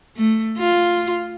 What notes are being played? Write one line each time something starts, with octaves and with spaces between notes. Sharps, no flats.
A3
F4